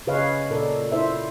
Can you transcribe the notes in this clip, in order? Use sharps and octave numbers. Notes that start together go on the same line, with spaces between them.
C#3 G#4 B4 C#5 D#5 F5
A#2 A4 A#4 D5
E4 C5 E5